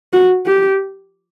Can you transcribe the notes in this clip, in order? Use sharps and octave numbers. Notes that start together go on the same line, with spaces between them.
F#4
G4